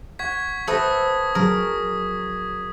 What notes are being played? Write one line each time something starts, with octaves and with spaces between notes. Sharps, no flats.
F#5 C#6 G#6 B6
A4 B4 C5 E5 D#6 A#6
F#3 C#4 G#4 A#4 D#6